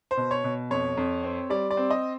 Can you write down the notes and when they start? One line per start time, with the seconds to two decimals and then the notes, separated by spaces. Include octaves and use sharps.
0.11 C5
0.17 B2
0.31 C#5
0.44 B2
0.70 F2 C#5
0.97 F2
1.24 C4
1.50 G3 D5
1.71 D5
1.77 C4
1.91 D#5